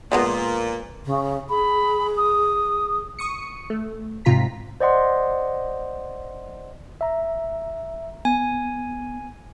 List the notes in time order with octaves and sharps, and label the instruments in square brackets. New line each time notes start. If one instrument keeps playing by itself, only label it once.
[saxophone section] A#2 [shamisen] F3 G#3 B3
[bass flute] C#3
[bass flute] G#4 [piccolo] B5
[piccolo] D#6
[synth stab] C#6 D#6 C#7
A3
G#2 C3 F4 A#5 B6
[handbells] C5 D5 D#5 F#5 C6
[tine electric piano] E5 A#5
[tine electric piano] B3 [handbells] G#5